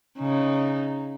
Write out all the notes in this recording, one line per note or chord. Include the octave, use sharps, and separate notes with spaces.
C#3 D#4